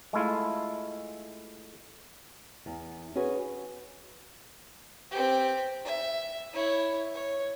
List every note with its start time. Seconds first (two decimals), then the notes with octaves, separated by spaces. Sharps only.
0.13 G#3 A3 E4 F4
2.66 E2
3.15 C#4 F#4 G#4 B4 C#5
5.11 C4 G4
5.85 E5
6.53 E4 C#5
7.14 C#5